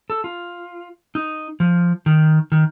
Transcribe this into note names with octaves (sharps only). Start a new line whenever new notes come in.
A4
F4
D#4
F3
D#3
D#3